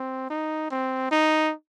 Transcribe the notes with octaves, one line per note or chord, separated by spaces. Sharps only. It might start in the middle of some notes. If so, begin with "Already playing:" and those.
Already playing: C4
D#4
C4
D#4